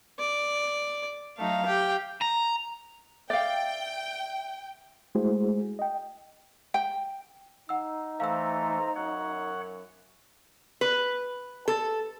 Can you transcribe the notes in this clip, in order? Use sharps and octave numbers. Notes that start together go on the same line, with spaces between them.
D5
F#3 A3 D#4 F5
G4 G5
A#5
D5 E5 F5 G5
G#3 A3 E4 F#4 G#4 C5
D#5 G5
G5
D#4 F#5 E6
E3 A3 A4 C5 F5 A#5 E6
F#2 C#5 F#5
B4
A4